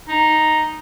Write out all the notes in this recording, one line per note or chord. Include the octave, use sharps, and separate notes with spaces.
D#4